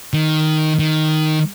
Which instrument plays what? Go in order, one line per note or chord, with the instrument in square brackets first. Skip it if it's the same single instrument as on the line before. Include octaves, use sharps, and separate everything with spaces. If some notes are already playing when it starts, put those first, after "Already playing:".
[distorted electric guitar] D#3
D#3